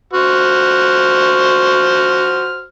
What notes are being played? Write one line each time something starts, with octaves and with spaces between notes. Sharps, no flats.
F#4 C5 F6